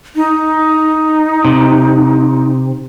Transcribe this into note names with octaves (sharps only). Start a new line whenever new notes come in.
D#4
C3